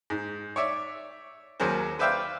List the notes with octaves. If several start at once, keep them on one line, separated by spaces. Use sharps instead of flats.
G#2
C#5 D5 E5
D#2 F#3 G#4 A#4 C5
B4 C5 D5 E5 F5 G5